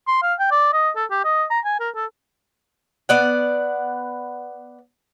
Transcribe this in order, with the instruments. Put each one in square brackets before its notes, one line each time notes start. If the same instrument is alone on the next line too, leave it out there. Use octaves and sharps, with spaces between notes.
[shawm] C6
F5
G5
D5
D#5
A4
G4
D#5
A#5
G#5
A#4
A4
[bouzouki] B3 D5 F#5